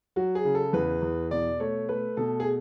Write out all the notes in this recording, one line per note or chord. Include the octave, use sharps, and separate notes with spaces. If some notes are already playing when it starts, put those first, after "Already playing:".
F#3 F#4
G#4
C#3
A4
E2 B4
E2
B2 D5
A3 C#5
A3 B4
B2 A4
G#4